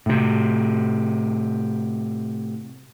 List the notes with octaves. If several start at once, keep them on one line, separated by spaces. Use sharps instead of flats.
A2 C3